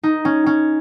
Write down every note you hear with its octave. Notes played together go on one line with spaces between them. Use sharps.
D#4
C#4
C#4